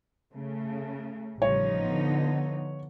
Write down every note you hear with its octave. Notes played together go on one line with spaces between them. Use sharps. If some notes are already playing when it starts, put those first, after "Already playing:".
C#3 A3
A1 C#3 F3 G3 D#4 C#5
D3 B3